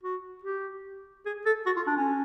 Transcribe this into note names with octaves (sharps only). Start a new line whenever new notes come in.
F#4
G4
G#4
A4
F#4
F4
D4
C#4